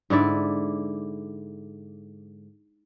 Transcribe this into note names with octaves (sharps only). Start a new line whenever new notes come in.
G#2 D3 E4 D5